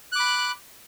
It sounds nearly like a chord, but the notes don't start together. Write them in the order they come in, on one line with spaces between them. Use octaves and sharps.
F#6 D6 B5